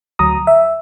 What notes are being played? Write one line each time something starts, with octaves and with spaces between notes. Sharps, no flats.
D2 F#3 A#5 D#6
E5